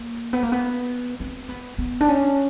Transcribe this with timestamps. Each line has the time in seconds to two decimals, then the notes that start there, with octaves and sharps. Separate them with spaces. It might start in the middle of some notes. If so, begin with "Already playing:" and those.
Already playing: A#3
0.33 B3
0.43 A#3
0.52 B3
1.20 C4
1.49 B3
1.78 B3
2.01 D4
2.08 C#4